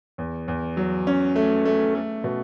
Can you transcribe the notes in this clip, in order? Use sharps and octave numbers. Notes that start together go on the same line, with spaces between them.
E2
E2
F#3
C#4
A3
A3
A3
B2